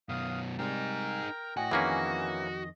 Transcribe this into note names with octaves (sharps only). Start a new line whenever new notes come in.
F#2 B2 F5 D#6
C3 G3 G#3 D#4 G#4 A#4 G5 A#5
A2 F#4 D#5 G5 G#5
F2 D#3 E3 A#3 C#4 G#4